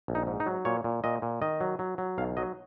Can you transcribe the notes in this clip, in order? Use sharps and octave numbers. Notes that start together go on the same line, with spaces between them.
A#1
D#4
G#2
D#4
F#3
A#2 C#5
A#2
A#2 D#5
A#2
D#3 D#5
F#3
F#3
F#3
B1 F5
F#3 D#5